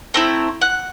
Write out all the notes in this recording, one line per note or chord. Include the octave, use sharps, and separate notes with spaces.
A3 C4 E4 A#5
F#5